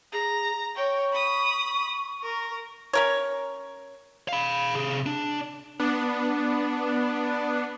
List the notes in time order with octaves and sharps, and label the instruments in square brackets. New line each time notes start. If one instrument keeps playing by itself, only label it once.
[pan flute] G#4 [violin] A#5
[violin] C#5 G5 [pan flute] C#6
[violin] B5 D#6
A#4
[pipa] C#4 A#4 C#5
[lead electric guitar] F5 B5
C3 G#4
D4
[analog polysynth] B3 D4